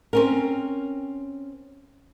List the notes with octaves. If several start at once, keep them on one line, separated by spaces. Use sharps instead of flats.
C4 C#4 A#4